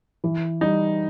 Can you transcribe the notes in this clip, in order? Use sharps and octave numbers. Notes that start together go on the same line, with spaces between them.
E3
G3 D#4